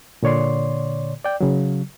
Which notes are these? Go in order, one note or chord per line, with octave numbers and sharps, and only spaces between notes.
A#2 D3 C#5 D5 C6
D5 G5
C#3 F#3